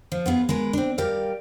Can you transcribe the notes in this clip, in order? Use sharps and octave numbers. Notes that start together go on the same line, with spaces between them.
F3
B3 F4 G4 G#4
G#3 A#4 B4
C4 D4
G3 G4 A#4 D5 F5